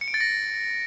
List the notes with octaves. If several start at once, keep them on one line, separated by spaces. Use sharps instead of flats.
C#7
D7
A6
A#6